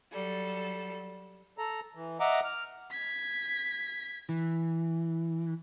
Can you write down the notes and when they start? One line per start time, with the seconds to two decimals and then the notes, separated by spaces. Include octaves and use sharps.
0.11 F#3 G3 A4
1.58 A4 A#5
1.95 E3
2.20 D#5 E5 F#5 A#5 D6
2.44 F6
2.91 G#6 B6
4.29 E3